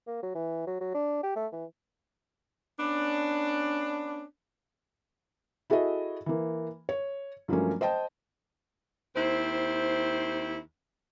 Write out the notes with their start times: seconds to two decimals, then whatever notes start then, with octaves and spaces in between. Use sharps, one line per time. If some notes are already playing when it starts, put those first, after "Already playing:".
0.07 A#3
0.23 F#3
0.35 E3
0.67 F#3
0.81 F#3
0.94 D4
1.23 G4
1.36 A3
1.52 E3
2.79 B3 C#4 D4
5.70 E4 F#4 G#4 A4 D#5 E5
6.26 E3 A#3
6.89 C#5
7.48 G2 F3 F#3 A3 A#3 C#4
7.81 C5 D#5 G5 A5
9.15 D#2 C4 E4 C5